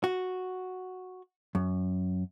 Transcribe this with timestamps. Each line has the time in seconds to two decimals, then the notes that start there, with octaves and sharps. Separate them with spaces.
0.04 F#4
1.55 F#2